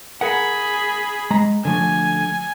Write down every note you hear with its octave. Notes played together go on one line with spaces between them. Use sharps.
G#4 A#4 F#5 B5
G#3 A#5
D3 F3 A3 G#5